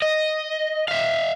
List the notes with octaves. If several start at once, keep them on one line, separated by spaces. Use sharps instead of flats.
D#5
E5 F5